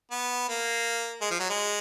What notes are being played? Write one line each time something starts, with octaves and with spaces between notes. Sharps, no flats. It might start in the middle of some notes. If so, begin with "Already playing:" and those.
B3
A#3
G#3
F3
F#3
G#3